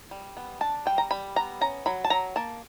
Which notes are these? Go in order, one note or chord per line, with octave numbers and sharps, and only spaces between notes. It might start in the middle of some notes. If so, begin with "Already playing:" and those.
G3
B3
D4 A5
G3 G5
A#5
G3 B5
B3 A#5
C#4 A#5
F#3 B5
A5
F#3 A#5
A#3 A5